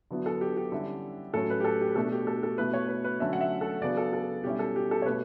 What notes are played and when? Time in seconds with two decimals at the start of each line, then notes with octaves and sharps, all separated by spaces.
0.11 D3 F#3 B3 E4
0.26 A4
0.41 G4
0.57 G4
0.72 D3 G3 C#4 E4
1.34 A2 F#3 C#4 A4
1.50 B4
1.60 G4
1.64 A4
1.81 G4
1.96 B2 A3 D4 A4
2.12 G4
2.27 A4
2.43 A4
2.58 B2 A3 E4 B4
2.74 C#5
2.89 B4
3.04 B4
3.20 D3 F#3 A3 C#4 E5
3.33 F#5
3.41 E5
3.61 A4
3.82 C#3 F#3 B3 D4 D5
3.97 A4
4.13 A4
4.44 B2 G3 C#4 E4 G4
4.59 A4
4.76 G4
4.91 A4
5.02 C#5
5.06 B2 A3 B4